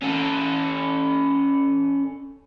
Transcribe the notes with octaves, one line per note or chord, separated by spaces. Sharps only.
C#4 A4